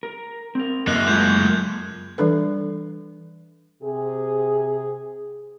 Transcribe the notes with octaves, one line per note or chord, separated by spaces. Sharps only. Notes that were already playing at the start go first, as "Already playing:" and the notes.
A#4
C4 A#4
F#2 A#3 D#5 E5 F#6
G#3 A3 F4 G6 G#6
E3 G3 D4 A4 B4
C3 G#4